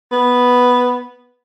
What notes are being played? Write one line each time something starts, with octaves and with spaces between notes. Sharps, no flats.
B3